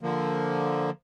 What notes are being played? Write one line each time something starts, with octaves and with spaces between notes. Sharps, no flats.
D3 F3 A#3